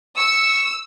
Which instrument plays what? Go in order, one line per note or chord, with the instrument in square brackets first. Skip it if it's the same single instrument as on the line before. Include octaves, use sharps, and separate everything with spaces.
[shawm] C#6 [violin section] E6